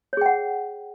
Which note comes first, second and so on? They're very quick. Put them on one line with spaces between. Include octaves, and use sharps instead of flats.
C#5 G#4 G5 F#5